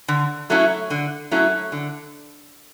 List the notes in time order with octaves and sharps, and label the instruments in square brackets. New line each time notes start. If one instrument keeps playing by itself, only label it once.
[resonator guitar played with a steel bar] D3
F#3 A3 C#4 E4
D3
F#3 A3 C#4 E4
D3